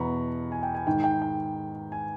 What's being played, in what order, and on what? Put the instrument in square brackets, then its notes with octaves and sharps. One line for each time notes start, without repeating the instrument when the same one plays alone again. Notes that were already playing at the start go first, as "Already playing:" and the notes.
Already playing: [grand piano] E2 B2 A#5 B5 C#6
G#5
G5
G#5
G#2 D#3 G5
G5
G5
G#5